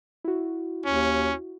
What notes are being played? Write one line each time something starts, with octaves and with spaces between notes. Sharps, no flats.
E4 F#4
D#2 C#4